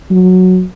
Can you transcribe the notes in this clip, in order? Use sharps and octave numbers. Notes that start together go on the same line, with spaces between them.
F#3